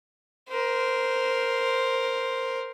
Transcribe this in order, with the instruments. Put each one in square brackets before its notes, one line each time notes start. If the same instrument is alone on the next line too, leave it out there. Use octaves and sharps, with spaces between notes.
[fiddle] A#4 C5